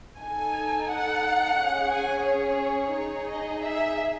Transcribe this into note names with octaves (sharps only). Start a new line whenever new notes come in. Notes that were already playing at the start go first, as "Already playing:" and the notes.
D#4 A4 G#5
F#5
C#4 G#4
G#5
C#5
D#4 G#4
D#5
E5